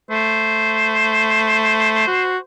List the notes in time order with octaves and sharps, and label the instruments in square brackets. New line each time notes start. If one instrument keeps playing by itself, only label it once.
[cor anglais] A3 [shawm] C5
[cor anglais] F#4